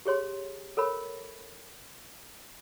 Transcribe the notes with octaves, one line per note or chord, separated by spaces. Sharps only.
G4 G#4 C#5 C6
A4 A#4 C#5 B5